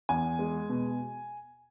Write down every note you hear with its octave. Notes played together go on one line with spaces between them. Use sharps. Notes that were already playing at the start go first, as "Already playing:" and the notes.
E2 G#5
G#3
B2